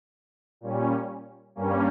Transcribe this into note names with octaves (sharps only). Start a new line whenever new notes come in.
A#2 G3 C#4
G2 G3 A#3 C#4